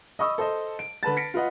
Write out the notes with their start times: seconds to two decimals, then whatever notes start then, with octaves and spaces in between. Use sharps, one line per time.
0.19 D#5 B5 C#6 D#6 E6
0.38 A4 C5 D#5
0.79 D7
1.03 D3 B4 A5 A6
1.17 A#6 B6 C#7 D7
1.34 F4 B4 D#5 F#5